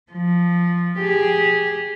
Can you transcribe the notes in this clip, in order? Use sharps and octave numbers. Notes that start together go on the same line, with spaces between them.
F3
G4 G#4